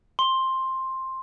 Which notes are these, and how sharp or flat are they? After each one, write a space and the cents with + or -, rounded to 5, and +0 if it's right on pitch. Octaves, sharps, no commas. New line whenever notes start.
C6 +10